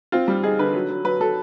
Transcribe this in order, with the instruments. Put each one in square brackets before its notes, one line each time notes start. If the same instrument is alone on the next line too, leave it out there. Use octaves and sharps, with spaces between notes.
[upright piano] C4 F4
G3
D#4 G#4
D3 B4
F#3
F#3
F#3 B4
F#3 A4